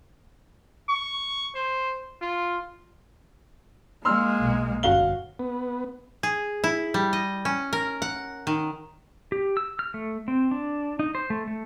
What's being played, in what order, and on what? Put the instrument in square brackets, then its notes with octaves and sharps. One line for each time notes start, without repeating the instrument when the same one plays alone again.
[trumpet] C#6
C5
F4
[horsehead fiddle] G#3 A#3 [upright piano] C6 E6 F6
[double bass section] B1 B2
[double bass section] G1 F#2 C#4 [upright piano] F#4 F5 G7
[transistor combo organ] B3
[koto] G#4
E4
G3
D#5
C#4
A#4
F#5
D#3
[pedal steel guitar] G4
E6
F6
A3
C4
D4
D#4
C5
A3
A3